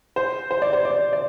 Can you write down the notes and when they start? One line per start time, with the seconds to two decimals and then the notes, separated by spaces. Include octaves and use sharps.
0.16 C5
0.51 C5
0.62 D5
0.73 C5
0.85 D5
1.13 D5